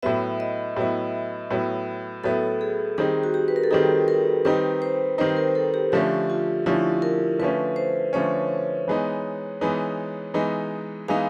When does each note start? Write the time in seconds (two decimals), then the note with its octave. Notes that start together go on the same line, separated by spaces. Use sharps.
0.03 A2 F#3 B3 E4 E5
0.40 D#5
0.76 A2 F#3 B3 E4
1.51 A2 F#3 B3 E4
2.24 A2 F#3 B3 E4 A4
2.61 G#4
2.98 D#3 G3 C4 D#4 G#4
3.24 F#4
3.34 G4
3.48 B4
3.56 A#4
3.64 A4
3.71 D#3 G3 C4 D#4 G#4
4.08 A#4
4.45 D#3 G3 C4 D#4 B4
4.82 C5
5.18 D#3 G3 C4 D#4 C5
5.37 A#4
5.55 A4
5.74 G4
5.92 D3 F3 A3 C#4 G4
6.30 F4
6.66 D3 F3 A3 C#4 E4
7.02 A#4
7.39 D3 F3 A3 C#4 B4
7.76 C5
8.13 D3 F3 A3 C#4 C#5
8.88 E3 G#3 B3 D#4
9.61 E3 G#3 B3 D#4
10.34 E3 G#3 B3 D#4
11.08 E3 G#3 B3 D#4 F5